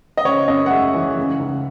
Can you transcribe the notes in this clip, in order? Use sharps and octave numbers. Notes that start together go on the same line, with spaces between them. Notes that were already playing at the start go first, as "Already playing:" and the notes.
D#5
C#3 C#5
F#2 D#5
F#5
G#3 E5
E3
C#3
C#2